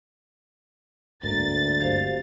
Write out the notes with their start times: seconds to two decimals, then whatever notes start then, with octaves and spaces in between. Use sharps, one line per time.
1.23 D2 G#2 A#3 A#4 A6
1.80 G1 C4 G4 C5 F5